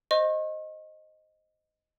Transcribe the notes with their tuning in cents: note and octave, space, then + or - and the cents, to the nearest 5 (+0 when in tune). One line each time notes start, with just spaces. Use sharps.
C5 +0 D#5 +0 C#6 -45